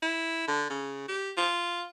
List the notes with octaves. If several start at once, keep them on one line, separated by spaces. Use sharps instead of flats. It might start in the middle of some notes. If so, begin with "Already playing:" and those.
E4
D3
C#3
G4
F4